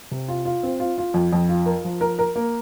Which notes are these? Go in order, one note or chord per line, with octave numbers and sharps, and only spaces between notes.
C3
F4
F4
C4
F4
F4
F2
F2
F4
A#4
F3
A#4
A#4
A#3